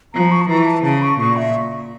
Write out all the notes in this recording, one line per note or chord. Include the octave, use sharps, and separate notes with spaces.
F3 A#5
C#6
A5
E3 A#5
A5
C#3 A5
C#6
A#2 C#6
E5